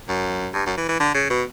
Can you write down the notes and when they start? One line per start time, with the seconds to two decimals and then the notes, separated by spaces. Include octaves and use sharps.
0.08 F#2
0.54 G2
0.66 F#2
0.77 E3
0.89 E3
1.00 D3
1.14 C#3
1.30 B2